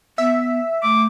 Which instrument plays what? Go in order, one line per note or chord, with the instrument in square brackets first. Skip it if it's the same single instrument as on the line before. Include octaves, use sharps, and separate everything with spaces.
[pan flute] B3 [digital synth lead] E5
[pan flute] A3 [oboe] D6